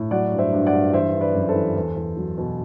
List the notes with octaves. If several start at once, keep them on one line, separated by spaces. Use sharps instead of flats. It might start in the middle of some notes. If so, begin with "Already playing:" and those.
Already playing: A2
F#3 D5 F#5
G2
C5 E5
G2
D5 F#5
G2
E3 C5 E5
E3
B4 D5
F#2
A4 C5
E3
E2
E2
F#3
B2